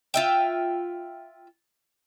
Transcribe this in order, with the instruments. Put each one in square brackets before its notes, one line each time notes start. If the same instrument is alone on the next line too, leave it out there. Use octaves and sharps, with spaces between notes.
[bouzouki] F4 E5 G5